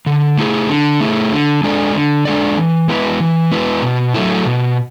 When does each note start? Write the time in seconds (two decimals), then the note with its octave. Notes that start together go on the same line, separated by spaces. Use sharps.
0.06 D3
0.38 A3 E4 G#4
0.69 D3
1.01 A3 E4 G#4
1.32 D3
1.63 G#3 D4 A4 D5
1.94 D3
2.25 G#3 D4 A4 D5
2.57 E3
2.88 G#3 B3 E4 B4
3.20 E3
3.52 G#3 B3 E4 B4
3.82 B2
4.14 F#3 A3 E4
4.45 B2